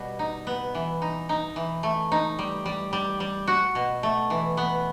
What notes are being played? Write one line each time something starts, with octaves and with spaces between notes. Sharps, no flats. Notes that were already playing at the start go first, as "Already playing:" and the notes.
Already playing: B2 G3
D#4
B3
E3
D#4
D#4
E3
A3
D#4
G3
G3
G3
G3
F#4
B2
A3
E3
B3